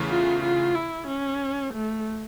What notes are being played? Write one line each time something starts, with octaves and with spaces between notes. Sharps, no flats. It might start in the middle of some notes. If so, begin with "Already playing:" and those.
Already playing: E2 C#3 E3 A3
F4
F4
E4
C#4
A3